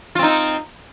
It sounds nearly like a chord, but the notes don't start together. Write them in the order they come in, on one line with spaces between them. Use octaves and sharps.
F4 C4 D#4